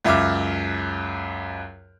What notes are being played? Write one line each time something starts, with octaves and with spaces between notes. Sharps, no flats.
C#2 F#2 E5 D6 F6